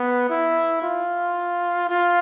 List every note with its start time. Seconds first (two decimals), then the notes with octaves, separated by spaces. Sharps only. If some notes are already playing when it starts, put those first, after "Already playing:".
Already playing: B3
0.30 E4
0.82 F4
1.89 F4